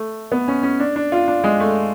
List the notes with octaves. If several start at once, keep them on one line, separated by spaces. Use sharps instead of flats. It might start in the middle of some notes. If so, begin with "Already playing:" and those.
Already playing: A3
B3
C#4
C#4
D4
D4
F4
D4
G#3
A3